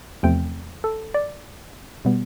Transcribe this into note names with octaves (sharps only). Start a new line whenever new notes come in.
E2 C3 F3 A3 C4 G5
A4
D5
B2 G3 B3